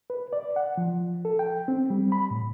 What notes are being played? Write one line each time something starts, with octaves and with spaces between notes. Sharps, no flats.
B4
D5
F#5
F3
A4
G5
C4
G3
B5
A2